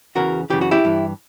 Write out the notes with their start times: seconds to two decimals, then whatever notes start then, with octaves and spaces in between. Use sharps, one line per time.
0.15 E2 C#3 E3 F#4 A#4
0.50 F#2 C#3 E3 G4
0.61 F#4
0.71 E4 G4
0.85 G2 E3